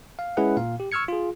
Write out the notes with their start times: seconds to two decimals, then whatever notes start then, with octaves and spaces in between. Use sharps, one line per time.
0.19 F5
0.37 G#3 C#4 E4 G#4 B4 F#5
0.57 A#2 F5
0.80 G4
0.92 C#6 E6 F6 G#6 C#7
1.08 F4 G#4